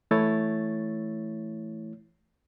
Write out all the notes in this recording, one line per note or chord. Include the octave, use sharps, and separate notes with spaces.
E3 A3 E4 C#5 A6